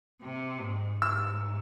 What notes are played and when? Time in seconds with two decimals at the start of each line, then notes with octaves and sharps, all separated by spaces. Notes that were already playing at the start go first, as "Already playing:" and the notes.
0.22 C3
0.61 G#2
1.02 G#2 E6